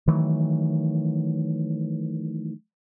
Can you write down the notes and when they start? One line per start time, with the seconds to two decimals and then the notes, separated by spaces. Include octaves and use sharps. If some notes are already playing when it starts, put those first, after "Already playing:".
0.07 D#3 E3 F#3 A3